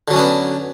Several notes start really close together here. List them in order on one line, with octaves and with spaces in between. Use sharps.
D3 F#3 C#4 D4 B3